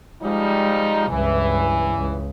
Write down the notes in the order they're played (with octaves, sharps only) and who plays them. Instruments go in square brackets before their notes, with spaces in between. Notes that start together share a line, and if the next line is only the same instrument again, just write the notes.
[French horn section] F3 G3 D#4 [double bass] G#3
[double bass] C#2 G2 [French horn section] E3
[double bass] C#2